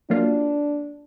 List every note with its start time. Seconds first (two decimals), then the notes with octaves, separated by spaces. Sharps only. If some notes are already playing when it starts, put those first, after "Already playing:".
0.10 F#3 A#3 D4 F4